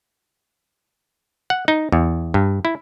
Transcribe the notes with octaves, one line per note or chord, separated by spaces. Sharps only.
F#5
D#4
E2
G2
E4